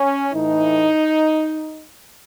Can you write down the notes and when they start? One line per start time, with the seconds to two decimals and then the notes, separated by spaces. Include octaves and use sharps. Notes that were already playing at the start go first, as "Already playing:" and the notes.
Already playing: C#4
0.34 A2 E3 D#4